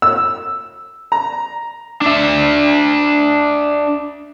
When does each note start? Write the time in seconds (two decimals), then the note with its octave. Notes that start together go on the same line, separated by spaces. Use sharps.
0.02 E6
1.12 A#5
2.02 D4 E5